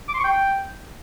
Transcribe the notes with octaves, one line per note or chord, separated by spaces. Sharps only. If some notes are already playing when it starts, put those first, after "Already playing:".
D6
C6
C#6
G5